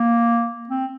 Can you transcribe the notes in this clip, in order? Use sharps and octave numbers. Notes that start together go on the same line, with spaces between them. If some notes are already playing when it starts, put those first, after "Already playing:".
Already playing: A#3
C4